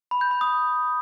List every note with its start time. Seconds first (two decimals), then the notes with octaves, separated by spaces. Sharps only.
0.11 B5
0.21 G6
0.31 B5
0.41 D#6